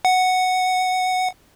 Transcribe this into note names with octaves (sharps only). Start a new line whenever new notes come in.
F#5